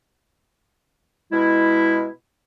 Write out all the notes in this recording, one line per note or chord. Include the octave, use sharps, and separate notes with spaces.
B2 G#3 E4